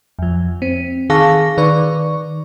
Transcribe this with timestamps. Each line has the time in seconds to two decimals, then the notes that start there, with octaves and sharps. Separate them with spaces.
0.19 F2 F3
0.62 C4
1.10 D#3 G#4 F5 A5 C#6 A#6
1.58 D#3 B4 D5 C#6